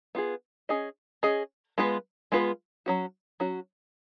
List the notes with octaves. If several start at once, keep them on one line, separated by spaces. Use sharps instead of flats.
B3 F4 G#4
C#4 G#4 D#5
C#4 G#4 D#5
G#3 B3 F4 B4
G#3 B3 F4 B4
F#3 C#4 F#4
F#3 C#4 F#4